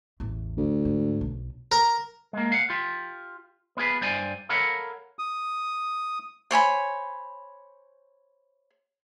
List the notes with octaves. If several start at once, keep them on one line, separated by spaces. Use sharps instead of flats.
A1 E2
D2
G#2
B1
A#4
G#3 A#3
F5 F#5
F4 G4
B3 F4 G#4 B4
G2 C5 D5 G#5
A4 A#4 C#5 F5 F#5 B5
D#6
C5 C#5 G#5 B5